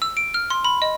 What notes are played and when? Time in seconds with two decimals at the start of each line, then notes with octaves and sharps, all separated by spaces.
0.02 E6
0.17 D7
0.34 F6
0.50 C6
0.64 B5
0.82 D#5